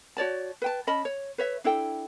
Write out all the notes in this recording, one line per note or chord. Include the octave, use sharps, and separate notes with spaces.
F#4 C#5 D5 A5
B4 G5 A5
C#4 D#5 A5 B5
C#5
B4 C#5 E5
D4 E4 A4 G5